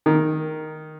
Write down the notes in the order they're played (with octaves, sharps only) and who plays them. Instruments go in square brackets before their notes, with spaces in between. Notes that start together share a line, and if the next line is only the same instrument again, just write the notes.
[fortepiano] D#3